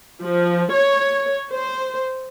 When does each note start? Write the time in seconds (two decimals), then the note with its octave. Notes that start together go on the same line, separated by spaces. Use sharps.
0.22 F3
0.73 C#5
1.53 C5